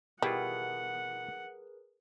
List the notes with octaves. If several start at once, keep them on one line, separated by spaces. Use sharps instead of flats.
B2 G3 E4 F4 G#4 A#4 B4 F#5